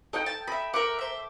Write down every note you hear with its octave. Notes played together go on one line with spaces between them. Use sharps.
D#4 A4 D#5 F#5 G5
A5
D#5 E5 B5
A#4 E5 F#5 D6
C5 E5